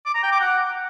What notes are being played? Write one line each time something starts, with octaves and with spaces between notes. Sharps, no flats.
D6
A#5
G5
D6
F#5